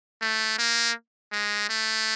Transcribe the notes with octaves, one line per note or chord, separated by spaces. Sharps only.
A3
A#3
G#3
A3